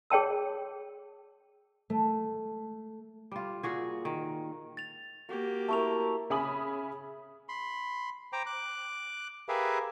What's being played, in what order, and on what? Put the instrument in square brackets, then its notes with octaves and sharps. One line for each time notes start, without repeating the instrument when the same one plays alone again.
[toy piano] G#4 C#5 G5 A5 E6
[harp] A3
[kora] G3 F4
A#2 F#4 G#4
D#3
[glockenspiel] A6 F7
[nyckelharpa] A#3 G4 [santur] F#4 G5
[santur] A3 E4 A#4 [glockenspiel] A5 C#6 F7
[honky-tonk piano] C#3 E5 G#5 B5 D#6 F#7
[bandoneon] B5 C6
C5 G5 A#5 D6
D6 F#6
G4 G#4 A#4 B4 E5 F5